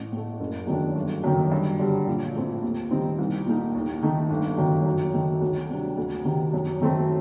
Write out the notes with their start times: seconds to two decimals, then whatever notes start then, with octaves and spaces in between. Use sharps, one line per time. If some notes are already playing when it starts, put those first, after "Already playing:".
Already playing: A1
0.12 A2 A3
0.40 F#1
0.67 F#2 D#3 A3 D4
0.95 G1
1.24 F#2 D#3
1.52 G2
1.79 D3 G3
2.07 A#1
2.35 A2 A3 C4
2.63 D#2
2.91 D#3 G3 C4 D#4
3.18 C2
3.46 A#2 A3 D#4
3.74 D#2
4.02 D#3 A3 D#4
4.30 G1
4.58 F#2 D#3
4.86 F#2
5.14 D#3 A3
5.41 D2
5.69 C3 G3 D4
5.98 D2
6.25 C3 D#3
6.53 F#2
6.81 D#3 A3 C4